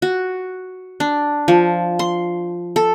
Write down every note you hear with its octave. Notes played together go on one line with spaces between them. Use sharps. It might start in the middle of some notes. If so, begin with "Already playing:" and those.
F#4
D4
F3
C6
A4